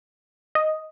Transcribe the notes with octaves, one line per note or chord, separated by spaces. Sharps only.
D#5